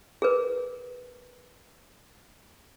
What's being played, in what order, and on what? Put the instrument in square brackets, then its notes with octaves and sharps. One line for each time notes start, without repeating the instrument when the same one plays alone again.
[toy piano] G#4 A#4 B4